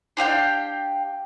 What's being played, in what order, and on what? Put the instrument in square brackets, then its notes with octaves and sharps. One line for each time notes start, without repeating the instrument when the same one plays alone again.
[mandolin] D4 G4 F5 G5